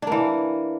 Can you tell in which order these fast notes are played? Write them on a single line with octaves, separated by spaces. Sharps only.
D4 A#3 E3